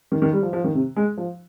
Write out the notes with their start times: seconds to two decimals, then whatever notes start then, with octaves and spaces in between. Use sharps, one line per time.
0.12 D#3
0.22 D#3
0.33 G3
0.42 F3
0.53 F3
0.64 D#3
0.75 C3
0.96 G#3
1.18 F3